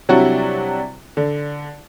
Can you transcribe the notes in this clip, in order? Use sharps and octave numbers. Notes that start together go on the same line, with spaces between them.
C3 F#3 G3 D4 E4 F#4
D3